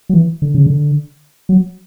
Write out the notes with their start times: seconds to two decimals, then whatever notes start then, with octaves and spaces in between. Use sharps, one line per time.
0.09 F#3
0.14 E3
0.42 D3
0.55 C#3
0.66 D3
1.49 F#3